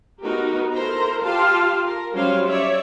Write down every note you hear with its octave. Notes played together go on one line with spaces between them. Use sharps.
B3 D#4 F#4 G4 A#4
E4 A4 A#4 C5 A#5
F4 G4 F5 A5
A#4
F#3 G3 C#4 C5 F5
C#5 D5 E5